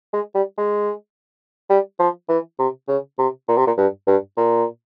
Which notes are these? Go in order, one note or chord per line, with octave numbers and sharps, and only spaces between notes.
G#3
G3
G#3
G3
F3
E3
C3
C#3
C3
A#2
C3
A#2
G2
G2
A#2